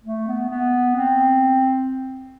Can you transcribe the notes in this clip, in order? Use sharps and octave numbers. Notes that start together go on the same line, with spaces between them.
A3
B3
B3
C4